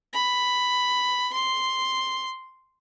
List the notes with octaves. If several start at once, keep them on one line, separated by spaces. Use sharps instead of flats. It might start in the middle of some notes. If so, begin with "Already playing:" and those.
B5
C6